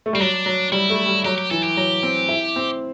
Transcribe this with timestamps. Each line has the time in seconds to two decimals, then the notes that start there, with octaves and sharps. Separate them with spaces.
0.06 A3
0.13 G3 C4
0.20 F#3 D4
0.46 F#3
0.72 G3 E4
0.90 A3
1.07 G3
1.25 F#3 G4
1.38 G4
1.51 E3 A4
1.63 G4
1.77 F#3
2.03 C4
2.29 E4
2.56 C4